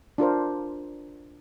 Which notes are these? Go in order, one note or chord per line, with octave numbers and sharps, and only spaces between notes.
D4 F4 A#4 C5